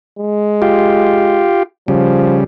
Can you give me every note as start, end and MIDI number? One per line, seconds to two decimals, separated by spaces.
0.19 1.51 56
0.62 1.63 65
0.62 1.63 67
1.88 2.44 49
1.88 2.39 53
1.88 2.44 55